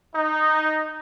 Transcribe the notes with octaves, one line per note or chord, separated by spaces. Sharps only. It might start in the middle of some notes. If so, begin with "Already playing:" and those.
D#4